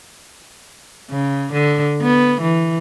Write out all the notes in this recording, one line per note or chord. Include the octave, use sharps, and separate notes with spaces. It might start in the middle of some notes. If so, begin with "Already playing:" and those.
C#3
D3
B3
E3